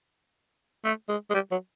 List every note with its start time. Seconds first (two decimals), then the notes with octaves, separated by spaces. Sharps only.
0.85 A3
1.09 G#3
1.30 G#3
1.34 G3
1.51 F#3